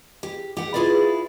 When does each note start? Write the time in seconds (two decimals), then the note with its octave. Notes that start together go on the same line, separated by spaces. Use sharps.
0.23 G4
0.57 G4 F#5
0.74 E4 F4 G#4 B4 D5